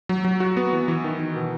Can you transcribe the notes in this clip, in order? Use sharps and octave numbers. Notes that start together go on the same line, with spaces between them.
F#3
F#3
F#4
B3
E3
E3
D#3
D#3
B2